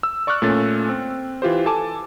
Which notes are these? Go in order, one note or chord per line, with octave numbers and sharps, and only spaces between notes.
E6
D5 C#6 D6 F6 F#6
A#2 A3 C#4 A6
C4
E3 F4 G4 C5
A4 G#5 A5 D6